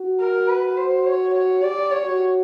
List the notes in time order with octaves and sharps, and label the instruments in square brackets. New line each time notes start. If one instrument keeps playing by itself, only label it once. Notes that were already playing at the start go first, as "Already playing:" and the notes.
Already playing: [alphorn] F#4
[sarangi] A#4
B4
C5
C#5
C#5
[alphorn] G4 [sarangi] D5
[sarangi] C#5
[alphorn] F#4